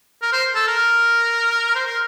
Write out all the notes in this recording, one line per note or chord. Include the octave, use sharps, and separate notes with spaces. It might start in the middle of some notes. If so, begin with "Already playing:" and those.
A#4
C5
A4
A#4
C5
A#4